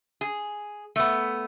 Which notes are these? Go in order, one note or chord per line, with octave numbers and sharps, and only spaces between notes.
G#4
A3 B3